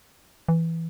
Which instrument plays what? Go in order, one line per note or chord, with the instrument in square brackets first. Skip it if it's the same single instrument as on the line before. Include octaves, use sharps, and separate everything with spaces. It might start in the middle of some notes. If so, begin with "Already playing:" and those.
[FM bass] E3